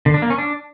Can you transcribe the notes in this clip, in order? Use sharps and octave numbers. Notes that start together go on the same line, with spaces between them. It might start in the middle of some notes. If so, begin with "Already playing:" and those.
D3
D4
A#3
C#4
D4